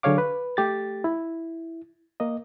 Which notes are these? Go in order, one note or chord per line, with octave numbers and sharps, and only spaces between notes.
D3 F#3 G#4 C#5 F5 D6
B4
A3 G4 A6
E4
A#3 D#5